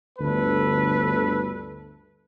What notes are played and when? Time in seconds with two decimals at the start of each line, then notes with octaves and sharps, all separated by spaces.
0.19 G1 D2 A4 B4